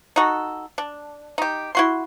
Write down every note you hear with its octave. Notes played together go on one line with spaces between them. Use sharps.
D#4 F#4 A4
D4
D#4 G4
E4 F#4 C6